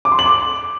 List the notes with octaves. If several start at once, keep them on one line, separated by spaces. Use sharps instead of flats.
D6
C6
F#7
D6